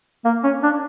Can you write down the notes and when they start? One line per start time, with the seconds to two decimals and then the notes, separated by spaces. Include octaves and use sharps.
0.25 A#3
0.44 C#4
0.63 D4